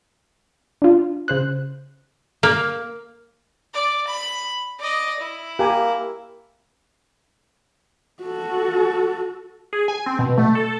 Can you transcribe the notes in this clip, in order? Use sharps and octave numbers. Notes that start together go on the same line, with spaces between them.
D4 F4
C#3 C5 F#6
A#3 F6
D5
B5
D5 D#5
E4
A#3 G4 G#5
F#4 A4
G#4
G#5
C4
B2
A3
A4